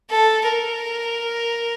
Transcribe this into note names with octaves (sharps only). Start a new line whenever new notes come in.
A4
A#4